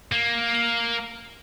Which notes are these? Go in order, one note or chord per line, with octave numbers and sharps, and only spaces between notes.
A#3